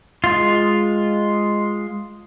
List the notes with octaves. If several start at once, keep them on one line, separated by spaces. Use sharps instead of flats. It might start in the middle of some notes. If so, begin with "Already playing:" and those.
G#3 F4